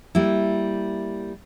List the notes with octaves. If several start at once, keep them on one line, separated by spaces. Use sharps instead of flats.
G3 A#3 E4